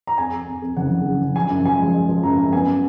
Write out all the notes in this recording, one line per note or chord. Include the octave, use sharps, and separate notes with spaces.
A#5
F2 G#5
F2
F2
F2
F#1 F#5
F#1
C#3
F#1
F3 G#5
F#2
F3 G#5
G#3
G#3
F3
F#2 A#5
F#2
B3 G#5